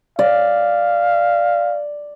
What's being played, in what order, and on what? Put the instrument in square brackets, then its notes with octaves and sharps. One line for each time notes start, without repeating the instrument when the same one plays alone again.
[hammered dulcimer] D5 [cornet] F5